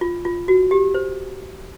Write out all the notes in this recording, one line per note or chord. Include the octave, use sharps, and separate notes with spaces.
F4
F4
F#4
G4
C5